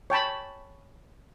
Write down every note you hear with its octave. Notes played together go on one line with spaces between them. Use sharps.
C#5 G5 A5 B5